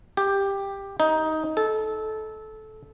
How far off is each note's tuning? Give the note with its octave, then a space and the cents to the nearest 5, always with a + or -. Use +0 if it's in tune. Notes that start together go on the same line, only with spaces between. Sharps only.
G4 +10
D#4 +15
A4 -20